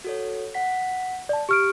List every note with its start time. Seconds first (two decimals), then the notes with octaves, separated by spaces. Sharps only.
0.04 F#4 A4 C#5
0.54 F#5 B6
1.29 D5 A5
1.49 G4 C#6 F6 D7